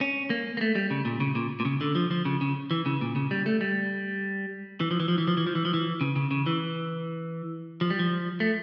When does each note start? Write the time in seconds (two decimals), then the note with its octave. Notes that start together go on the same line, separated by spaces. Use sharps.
0.01 C#4
0.30 A#3
0.57 A#3
0.61 A3
0.75 G3
0.90 C#3
1.05 A#2
1.20 C#3
1.35 A#2
1.60 A#2
1.65 C#3
1.81 D3
1.95 F3
2.11 F3
2.25 C#3
2.41 C#3
2.71 E3
2.86 C#3
3.01 A#2
3.16 C#3
3.31 G3
3.46 A3
3.61 G3
4.80 E3
4.91 F3
5.00 E3
5.08 F3
5.18 E3
5.28 F3
5.37 E3
5.47 F3
5.55 E3
5.65 F3
5.74 E3
6.01 C#3
6.16 C#3
6.31 C#3
6.46 E3
7.81 F3
7.90 G3
7.99 F3
8.40 A3